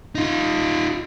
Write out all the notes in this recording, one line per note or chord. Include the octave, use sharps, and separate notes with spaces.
D#4 F4